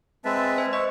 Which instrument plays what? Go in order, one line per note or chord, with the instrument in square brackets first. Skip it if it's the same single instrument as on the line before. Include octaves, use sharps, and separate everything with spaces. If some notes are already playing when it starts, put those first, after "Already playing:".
[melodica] G#3 [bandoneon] C4 B4 E5 [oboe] A5
[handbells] C5 [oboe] G#5
[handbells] D#5 [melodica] E5 [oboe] C#6